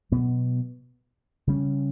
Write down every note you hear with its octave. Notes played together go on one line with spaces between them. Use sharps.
B2 F#3 B3
C#3 G3 C#4